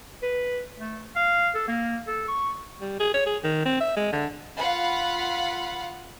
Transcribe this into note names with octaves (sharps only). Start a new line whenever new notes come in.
B4
A3
F5
A4
A#3
A4
C#6
G3
G#4
C#5
G#4
D#3
C4
E5
G#3
D3
F4 F5 F#5 B5